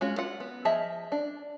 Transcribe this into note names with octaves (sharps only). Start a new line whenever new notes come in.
G#3 C#4 F4 F#4
F4 F#5
B3
F3 G#4 D#5 E5 A5
D4